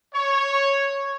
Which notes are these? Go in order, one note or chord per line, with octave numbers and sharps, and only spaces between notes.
C#5